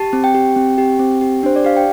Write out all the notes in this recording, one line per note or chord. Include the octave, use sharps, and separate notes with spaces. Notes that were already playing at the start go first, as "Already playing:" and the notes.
Already playing: G4 A5
C4
G5
G4
C4
G4
C4
G4
D4 C5
D5
G4 F5
G5